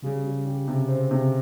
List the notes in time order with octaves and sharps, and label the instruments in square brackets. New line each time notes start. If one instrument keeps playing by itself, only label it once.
[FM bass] C#3 [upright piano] G3
[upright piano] G3
G4
C3
C4
C3